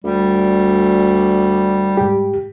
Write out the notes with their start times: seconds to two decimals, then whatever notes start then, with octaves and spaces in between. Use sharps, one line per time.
0.04 D2 G3
1.97 G#2 G4